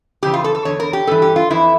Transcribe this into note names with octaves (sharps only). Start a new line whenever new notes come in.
F2 C#3 E3 G4
F4
A4
A4
E2 D3 C#5
A#4
G4
G2 E3 A4
G4
F4
F2 E3 E4